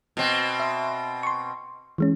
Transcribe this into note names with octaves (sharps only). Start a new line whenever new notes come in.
B2 C4
E5 C6
C6 C#6
E3 G#3 C#4